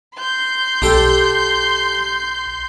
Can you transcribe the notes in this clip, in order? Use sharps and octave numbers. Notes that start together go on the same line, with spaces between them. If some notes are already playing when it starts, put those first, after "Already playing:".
C6 G6
B1 D4 G4 A4